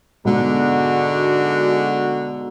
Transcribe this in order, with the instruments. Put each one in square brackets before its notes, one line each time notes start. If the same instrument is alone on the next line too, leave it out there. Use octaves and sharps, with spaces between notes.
[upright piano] G#2 B2 [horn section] D3 G#3 D4 F#4